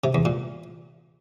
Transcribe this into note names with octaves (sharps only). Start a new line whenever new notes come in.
C3
E2
A#2